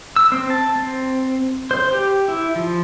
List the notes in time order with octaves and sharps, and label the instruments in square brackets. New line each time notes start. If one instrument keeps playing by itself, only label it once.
[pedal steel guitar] E6
C4
A5
C4
C5
G4
E4
F3